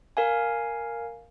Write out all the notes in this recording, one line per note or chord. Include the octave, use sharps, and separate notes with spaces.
A#4 F5 G#5